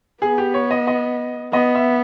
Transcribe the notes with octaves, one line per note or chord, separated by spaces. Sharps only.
B3 G#4
G4
C#5
D#5
D#5
B3 D#5
E5